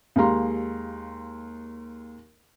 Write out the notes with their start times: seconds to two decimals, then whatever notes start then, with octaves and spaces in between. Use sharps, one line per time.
0.16 D#2 G#3 G4 F5 A#5 C6